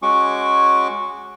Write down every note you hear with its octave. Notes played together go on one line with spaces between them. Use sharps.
G#3 C#4 F#4 C#6 D6